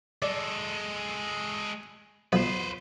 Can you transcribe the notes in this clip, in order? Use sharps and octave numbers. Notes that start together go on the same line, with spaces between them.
G#3 A4 D5
B1 F3 B4 C5